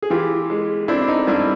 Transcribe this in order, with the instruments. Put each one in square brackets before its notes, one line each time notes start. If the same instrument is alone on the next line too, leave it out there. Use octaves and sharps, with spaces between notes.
[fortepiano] G#4
E3 F4 G4
G#3
C4 D4 E4
D4
D#4
G2 D4 E4